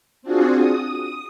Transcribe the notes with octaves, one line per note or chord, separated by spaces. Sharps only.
C4 D4 F4 F#4 G#4
D#6